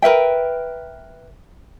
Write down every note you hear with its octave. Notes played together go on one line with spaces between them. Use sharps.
A#4 B4 E5 G5